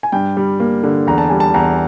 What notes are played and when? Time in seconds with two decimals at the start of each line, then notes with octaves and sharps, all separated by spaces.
0.03 G#5
0.12 G2 G5
0.37 G3
0.60 A#3
0.84 D3
1.07 E2 A#5
1.18 A5
1.30 G3 G#5
1.40 A5
1.54 E2 A#5